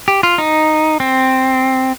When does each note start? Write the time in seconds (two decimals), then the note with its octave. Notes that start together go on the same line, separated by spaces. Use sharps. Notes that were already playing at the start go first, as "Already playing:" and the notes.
0.08 G4
0.23 F4
0.38 D#4
1.00 C4